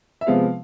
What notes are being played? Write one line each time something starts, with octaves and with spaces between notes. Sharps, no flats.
E5
C3 F3 G#3 B3 F5